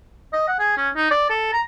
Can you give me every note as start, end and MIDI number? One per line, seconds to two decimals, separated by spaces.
0.33 0.46 75
0.48 0.55 78
0.59 0.72 68
0.77 0.89 61
0.96 1.08 63
1.11 1.25 74
1.30 1.49 69
1.53 1.61 82